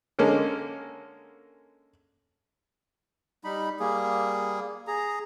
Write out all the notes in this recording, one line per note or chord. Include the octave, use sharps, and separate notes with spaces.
D3 G#3 A#3 C#4
G3 D#4 B5
G3 A#3 G#4
G#4 A#5